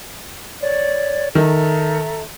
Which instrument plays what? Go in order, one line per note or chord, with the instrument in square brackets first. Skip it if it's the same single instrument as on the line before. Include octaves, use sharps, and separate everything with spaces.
[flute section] C#5 D5
[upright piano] D#3 [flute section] A4 E5 A#5